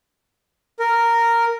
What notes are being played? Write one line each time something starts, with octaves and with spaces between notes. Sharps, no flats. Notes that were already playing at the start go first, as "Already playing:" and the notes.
A#4